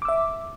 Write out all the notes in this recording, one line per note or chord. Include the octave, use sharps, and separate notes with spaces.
E5 D6 E6